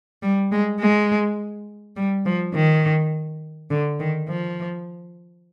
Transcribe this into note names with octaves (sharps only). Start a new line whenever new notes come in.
G3
G#3
G#3
G3
F3
D#3
D3
D#3
F3